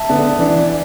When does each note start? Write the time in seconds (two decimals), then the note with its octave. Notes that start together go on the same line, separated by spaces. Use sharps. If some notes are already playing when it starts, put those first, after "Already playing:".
Already playing: E5 A5
0.09 D3 B3 D4
0.39 E3 D4
0.69 D4